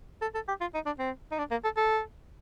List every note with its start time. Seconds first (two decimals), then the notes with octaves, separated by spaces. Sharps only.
0.22 A4
0.35 A4
0.48 G4
0.61 F4
0.74 D#4
0.86 D4
0.99 C4
1.31 D#4
1.38 D4
1.51 A#3
1.64 A4
1.77 A4